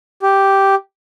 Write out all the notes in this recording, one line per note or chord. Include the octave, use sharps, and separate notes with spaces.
G4